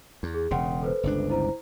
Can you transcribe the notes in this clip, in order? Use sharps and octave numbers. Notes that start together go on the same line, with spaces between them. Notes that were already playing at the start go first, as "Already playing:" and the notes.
E2
G#4
E1 C#3 F#5 G5 C6
A4 B4 C5
G1 C#2 D4
E4 C5 A#5